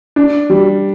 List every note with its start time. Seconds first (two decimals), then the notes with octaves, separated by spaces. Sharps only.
0.16 D4
0.50 G3